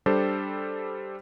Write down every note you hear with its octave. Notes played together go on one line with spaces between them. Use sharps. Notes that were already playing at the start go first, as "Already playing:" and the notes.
G3 D4 G4 A4 C5